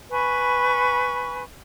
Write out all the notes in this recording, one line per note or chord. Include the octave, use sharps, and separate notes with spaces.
B4 G#5 B5 C#6